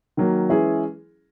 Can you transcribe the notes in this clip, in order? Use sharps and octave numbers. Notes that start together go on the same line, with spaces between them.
D#3 F#3 A#3
E3 G#3 C#4 E4 G#4